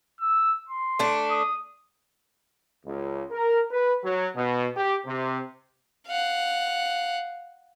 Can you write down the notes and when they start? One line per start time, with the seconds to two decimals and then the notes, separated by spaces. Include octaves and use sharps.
0.20 E6
0.69 C6
0.99 A3 D4
1.30 D#6
2.85 C#2
3.31 A#4
3.71 B4
4.04 F#3
4.35 B2
4.76 G4
5.06 C3
6.07 F5 F#5